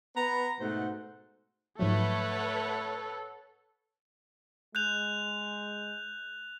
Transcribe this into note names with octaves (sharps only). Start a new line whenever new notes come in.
B3 B4 A#5
G#2 B2 A3 C5 F#5
G#2 F3 F#3 A3 A4 B4 C#5 F#5
G#3 F#6 G6 F7